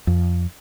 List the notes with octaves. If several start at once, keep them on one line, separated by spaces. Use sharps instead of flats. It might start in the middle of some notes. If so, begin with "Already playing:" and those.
F2